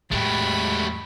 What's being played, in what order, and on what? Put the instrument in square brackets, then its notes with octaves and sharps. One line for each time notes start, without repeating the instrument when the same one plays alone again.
[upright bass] E2 A2 [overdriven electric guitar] F#3 A3 [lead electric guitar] G#3 G4 [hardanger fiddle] B5